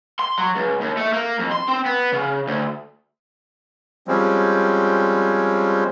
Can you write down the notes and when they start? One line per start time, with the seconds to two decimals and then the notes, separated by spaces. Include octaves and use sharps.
0.19 C6
0.38 F#3
0.56 C#2
0.81 D#2
0.97 A3
1.13 A#3
1.39 F2
1.52 C6
1.68 C4
1.86 B3
2.12 C#3
2.48 D2
4.08 F3 G3 G#3 C4 C#4